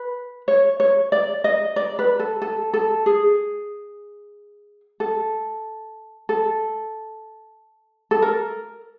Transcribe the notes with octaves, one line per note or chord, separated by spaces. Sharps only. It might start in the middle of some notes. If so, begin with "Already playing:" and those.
Already playing: B4
C#5
C#5
D5
D#5
D5
B4
A4
A4
A4
G#4
A4
A4
A4
A#4